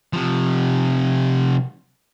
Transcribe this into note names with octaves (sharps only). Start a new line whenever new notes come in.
C3 F3